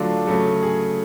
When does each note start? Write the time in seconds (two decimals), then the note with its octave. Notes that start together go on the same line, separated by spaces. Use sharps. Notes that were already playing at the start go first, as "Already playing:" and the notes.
Already playing: D3 F#3 A3 D4 F4
0.27 C#3 F#3 A3
0.63 G#4